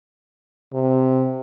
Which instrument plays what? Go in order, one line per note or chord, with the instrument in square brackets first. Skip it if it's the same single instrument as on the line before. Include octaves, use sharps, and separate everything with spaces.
[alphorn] C3